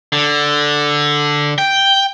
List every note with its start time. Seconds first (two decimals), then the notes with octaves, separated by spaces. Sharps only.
0.13 D3
1.58 G5